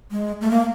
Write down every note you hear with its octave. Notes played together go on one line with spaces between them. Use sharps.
G#3
A3
A#3